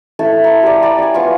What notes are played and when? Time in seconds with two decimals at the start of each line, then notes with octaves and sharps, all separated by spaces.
0.19 A3 E4 A5
0.44 A#5 C6
0.63 G4 D5
0.82 D5 B5
0.98 C#5 G#5
1.14 B3 F4 F5 C#6